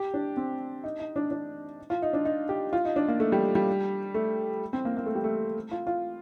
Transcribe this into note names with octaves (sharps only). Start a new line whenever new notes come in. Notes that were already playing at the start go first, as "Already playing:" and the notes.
Already playing: G4
D4
C4
D#4
D#4
D4
D4
F4
D#4
D4
D#4
G4
F4
D#4
D4
A#3
A3
G3
G3
A3
C4
A#3
A#3
A3
G3
A3
F4
F4